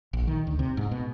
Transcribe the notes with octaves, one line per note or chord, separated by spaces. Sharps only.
A#1
D#3
D2
C3
G#2
B2